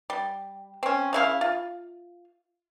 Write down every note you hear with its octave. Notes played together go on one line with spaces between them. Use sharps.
G3
C4 C#4
C#3 E4 F4 F5
F4